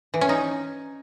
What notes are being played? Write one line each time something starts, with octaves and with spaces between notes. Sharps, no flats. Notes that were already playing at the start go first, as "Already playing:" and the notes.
E3
C#4
D#4